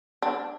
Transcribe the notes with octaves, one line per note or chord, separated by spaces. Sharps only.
D4